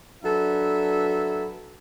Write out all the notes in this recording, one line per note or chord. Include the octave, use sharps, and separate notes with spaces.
F#3 D4 A4 B4 E5